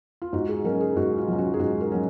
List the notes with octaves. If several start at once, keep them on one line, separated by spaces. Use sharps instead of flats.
F4
G#2 F#4
G#4
F#3 C#4 A#4
G#4
G#2 F#4
F4
F#3 C#4
F#4
G#4
G#2 F#4
A#4
F#3 C#4